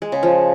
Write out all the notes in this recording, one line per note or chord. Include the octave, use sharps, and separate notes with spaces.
G#3
C#3
F3